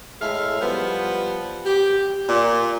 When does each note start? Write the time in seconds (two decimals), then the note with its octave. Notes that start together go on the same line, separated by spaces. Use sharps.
0.21 A2 G#3 E5 F5
0.61 F3 G3 B3
1.66 G4
2.29 A#2